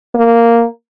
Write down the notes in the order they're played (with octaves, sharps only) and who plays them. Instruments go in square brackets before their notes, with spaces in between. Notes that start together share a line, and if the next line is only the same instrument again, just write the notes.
[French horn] A#3